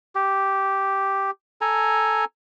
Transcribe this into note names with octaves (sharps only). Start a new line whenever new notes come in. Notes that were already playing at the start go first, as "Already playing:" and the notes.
G4
A4 G#5 A#5